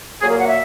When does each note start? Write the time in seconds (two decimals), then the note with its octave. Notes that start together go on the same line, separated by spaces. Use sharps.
0.21 A#2 F#3 A#3 G#4
0.30 A#4
0.38 F#5
0.47 E5